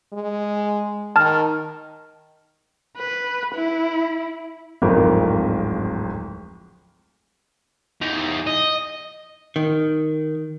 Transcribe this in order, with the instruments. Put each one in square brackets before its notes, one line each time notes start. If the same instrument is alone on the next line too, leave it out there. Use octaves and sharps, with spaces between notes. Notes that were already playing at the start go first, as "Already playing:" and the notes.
[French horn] G#3
[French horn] D#3 [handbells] A5 F6
[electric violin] B4
E4
[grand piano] D1 G#1 F2 F3 A#4
[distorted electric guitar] E2 D#4
D#5
[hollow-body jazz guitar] D#3